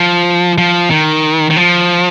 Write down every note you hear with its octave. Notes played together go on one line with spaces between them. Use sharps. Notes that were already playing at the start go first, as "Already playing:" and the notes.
Already playing: F3
F3
D#3
D#3
F3